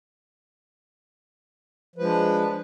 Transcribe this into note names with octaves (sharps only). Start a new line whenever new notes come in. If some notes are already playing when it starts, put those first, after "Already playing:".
F3 G#3 D4 B4